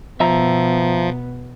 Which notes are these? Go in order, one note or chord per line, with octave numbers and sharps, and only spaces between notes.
B2 F3 B3 E5 A#5